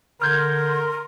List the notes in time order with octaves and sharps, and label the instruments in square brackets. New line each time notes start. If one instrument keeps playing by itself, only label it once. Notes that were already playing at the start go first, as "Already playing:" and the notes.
[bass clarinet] D3 [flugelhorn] A#4 [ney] C6 [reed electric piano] F6 G6 G#6